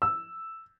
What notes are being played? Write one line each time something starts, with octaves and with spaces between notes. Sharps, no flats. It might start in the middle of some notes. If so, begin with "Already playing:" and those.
E6